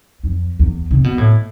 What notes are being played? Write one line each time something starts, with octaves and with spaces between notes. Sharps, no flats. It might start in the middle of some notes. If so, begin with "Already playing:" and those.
F2
E2
C3
B2
A2